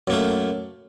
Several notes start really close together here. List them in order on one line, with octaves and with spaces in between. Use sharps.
F#2 A#3 A3